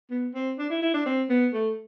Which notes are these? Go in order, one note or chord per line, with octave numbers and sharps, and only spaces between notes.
B3
C4
D4
E4
E4
D4
C4
B3
A3